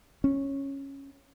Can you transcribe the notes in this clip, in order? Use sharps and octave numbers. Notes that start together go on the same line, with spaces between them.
C#4